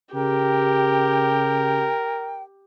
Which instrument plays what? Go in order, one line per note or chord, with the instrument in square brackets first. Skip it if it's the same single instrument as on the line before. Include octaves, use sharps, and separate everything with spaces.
[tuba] C#3 [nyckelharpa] G4 [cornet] A#4 [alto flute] G5